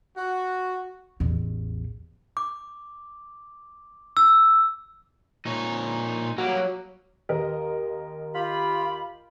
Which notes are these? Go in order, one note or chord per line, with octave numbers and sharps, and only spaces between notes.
F#4
A1 E2
D6
E6
A#2 D#4 C#5
F#3 G3 A#3
D#2 A#4 D#5
F4 G4 B5